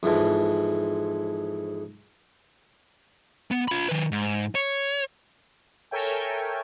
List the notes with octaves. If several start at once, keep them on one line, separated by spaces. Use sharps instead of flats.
F2 G#2 E3 F3
B3
F4 B5
D#3 B4
G#2
C#5
A4 A#4 C#5 E5 G5 G#5